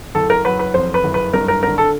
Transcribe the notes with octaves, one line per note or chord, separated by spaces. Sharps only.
F#1 A4
A#4
F#3 B4
B4
F2 C5
B4
F#1
B4
G2 A#4
A#4
D3 A#4
A4